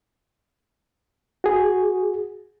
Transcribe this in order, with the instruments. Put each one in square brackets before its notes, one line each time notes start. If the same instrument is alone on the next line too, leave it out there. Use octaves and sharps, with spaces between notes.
[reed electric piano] F#4 G#4